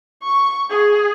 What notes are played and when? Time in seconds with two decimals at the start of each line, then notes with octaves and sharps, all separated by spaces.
0.22 C#6
0.69 G#4